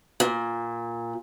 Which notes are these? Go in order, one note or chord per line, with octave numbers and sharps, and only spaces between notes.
A#2